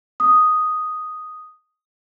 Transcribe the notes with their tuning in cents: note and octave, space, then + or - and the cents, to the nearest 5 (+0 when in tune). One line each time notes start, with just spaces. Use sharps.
D#6 +0